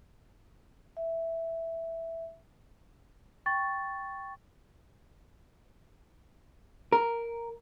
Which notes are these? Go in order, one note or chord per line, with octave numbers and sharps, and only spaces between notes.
E5
G5 C#6 A6
A#4